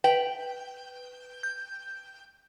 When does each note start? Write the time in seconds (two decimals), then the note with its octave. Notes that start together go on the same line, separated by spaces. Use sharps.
0.04 B4 G5
1.43 G6